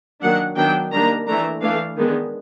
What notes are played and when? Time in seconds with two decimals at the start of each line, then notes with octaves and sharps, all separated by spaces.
0.22 D#3 F#3 A#3 D4 F#5
0.56 D#3 F#3 B3 D4 G5
0.91 D#3 G3 A#3 D4 A#5
1.27 E3 A3 D4 A#5
1.62 E3 A3 D4 F5
1.97 D#3 G#3 B3 D4